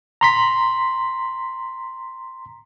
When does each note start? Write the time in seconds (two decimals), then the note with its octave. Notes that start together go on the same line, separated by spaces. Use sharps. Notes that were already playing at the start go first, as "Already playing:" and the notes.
0.21 A#5 C6 B6